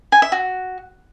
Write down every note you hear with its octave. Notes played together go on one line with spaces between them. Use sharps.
G#5
E5
F#4